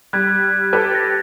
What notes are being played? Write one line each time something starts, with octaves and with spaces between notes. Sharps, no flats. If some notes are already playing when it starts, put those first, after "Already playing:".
G3 F#6 G#6
G4 A4 B4
A6 A#6